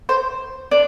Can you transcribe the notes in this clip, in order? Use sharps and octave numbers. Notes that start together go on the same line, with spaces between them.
C5
D4